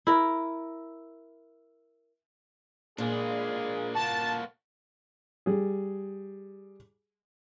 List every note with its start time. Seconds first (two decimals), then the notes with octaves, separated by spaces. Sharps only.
0.07 E4 A#4
2.98 A#2 G#3 A#3 D4 G#4
3.95 A#3 F#4 A5
5.46 G3 G#4